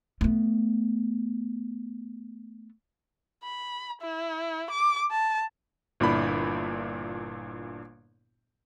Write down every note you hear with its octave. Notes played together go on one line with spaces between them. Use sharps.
A3 B3
B5
E4
D6
A5
G1 A#2 D4 E4 B5